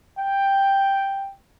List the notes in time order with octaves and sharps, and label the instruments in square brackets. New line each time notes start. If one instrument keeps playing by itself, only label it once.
[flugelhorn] G5